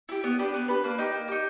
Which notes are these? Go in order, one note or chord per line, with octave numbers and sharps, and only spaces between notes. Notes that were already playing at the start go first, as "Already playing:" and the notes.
E4 G4
B3
D4 G4 B4
B3
D4 G4 B4
A#3
D#4 G4
A#3
D#4 G4